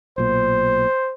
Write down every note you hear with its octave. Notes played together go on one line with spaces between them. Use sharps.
B1 A#2 C5